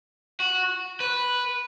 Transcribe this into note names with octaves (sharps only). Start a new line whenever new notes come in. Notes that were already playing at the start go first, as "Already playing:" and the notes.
F#4
B4